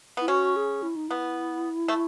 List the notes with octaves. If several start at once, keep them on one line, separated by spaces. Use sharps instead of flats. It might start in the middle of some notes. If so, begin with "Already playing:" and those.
B3 E4
C#4 F#4
G#4
E4
D#4
B3 E4
A3